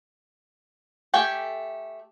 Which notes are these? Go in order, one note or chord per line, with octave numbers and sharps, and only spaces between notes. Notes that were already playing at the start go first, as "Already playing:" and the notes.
A3 G4 A4 G5 G#5